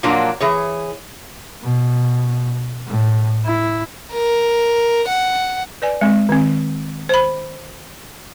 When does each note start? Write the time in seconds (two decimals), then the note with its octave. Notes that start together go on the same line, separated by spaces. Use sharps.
0.03 A#2 F3 F#3 A#3 D4 F#4
0.40 E3 G#4 C#5
1.63 B2
2.87 A2
3.46 E4
4.13 A#4
5.09 F#5
5.82 B4 D5 G#5
6.01 G#3 C4
6.29 D#3 C4
7.09 C5 B5